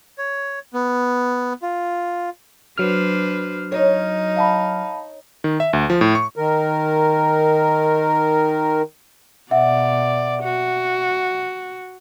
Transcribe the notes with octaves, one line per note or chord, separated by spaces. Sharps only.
C#5
B3
F4
F#3 D4 B4 C5 F6
D#4 C#5
F5 A5 B5
D#3
E5
D2
F3
A2
C#6
D#3 A#4
B2 D5 E5 F#5
F#4